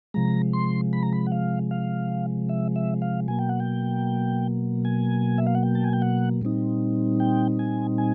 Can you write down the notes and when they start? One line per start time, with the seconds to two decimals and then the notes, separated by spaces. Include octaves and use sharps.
0.14 C3 F3 G#3 A#5
0.53 C6
0.93 B5
1.03 A#5
1.13 B5
1.27 F#5
1.32 F5
1.71 F5
2.49 E5
2.76 E5
3.02 F5
3.28 B2 F#3 A#3 G#5
3.39 G5
3.49 F#5
3.60 G5
4.85 G#5
5.38 E5
5.47 F5
5.55 F#5
5.63 G5
5.75 A5
5.84 G#5
5.93 G5
6.02 F#5
6.42 A#2 G3 C4 D#4
7.20 G5
7.59 G#5
7.98 G#5